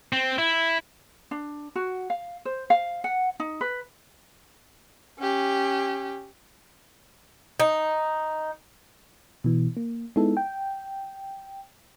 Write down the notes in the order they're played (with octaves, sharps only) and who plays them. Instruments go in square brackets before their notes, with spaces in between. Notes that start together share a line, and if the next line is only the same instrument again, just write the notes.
[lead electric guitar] C4
E4
[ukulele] D4
F#4
F5
C5
F5
F#5
D#4
B4
[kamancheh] C#4 G4
[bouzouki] D#4
[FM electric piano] B2 E3
A#3
G#3 B3 D#4 E4 A4
G5